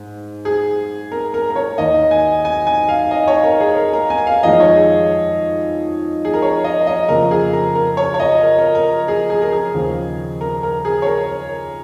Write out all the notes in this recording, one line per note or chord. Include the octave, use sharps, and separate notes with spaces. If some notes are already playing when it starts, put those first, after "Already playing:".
Already playing: G#2
G#4
A#4
A#4
A#4
C#5
D#2 D#3 A#3 D#5
G#5
G#5
G#5
F5
D#5
C#5
A#4
G#4
A#4
A#4
G#5
F5
F2 D#3 G#3 D#5
C#5
G#4
G#4
A#4
C#5
D#5
D#5
F2 C#3 A#3 A#4
G#4
A#4
A#4
C#5
C#5
D#5
A#4
A#4
A#4
G#4
G#4
A#4
G#4
D#2 C#3 F3
A#4
A#4
G#4
C#5
A#4